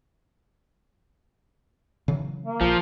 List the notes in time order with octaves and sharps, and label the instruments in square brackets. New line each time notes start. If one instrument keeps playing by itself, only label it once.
[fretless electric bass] C#3 E3 F#3
[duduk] A#3
[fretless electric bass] A#1 [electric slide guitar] F3